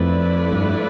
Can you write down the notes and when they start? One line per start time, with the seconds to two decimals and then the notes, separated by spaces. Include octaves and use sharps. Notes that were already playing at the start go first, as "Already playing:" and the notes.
Already playing: F2 F3 A3 E4 B4 D5
0.52 G2